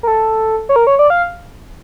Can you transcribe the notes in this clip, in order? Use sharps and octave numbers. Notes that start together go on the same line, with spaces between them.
A#4
A4
C#5
A#4
C#5
D5
F5